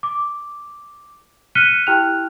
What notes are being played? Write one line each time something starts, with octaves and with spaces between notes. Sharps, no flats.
D6
F6 F#6 B6 C#7 D#7 G7
E4 G4 G5 F6 F#6 F7